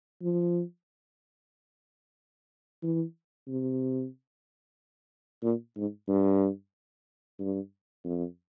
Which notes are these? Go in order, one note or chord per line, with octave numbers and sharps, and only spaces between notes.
F3
E3
C3
A#2
G#2
G2
G2
F2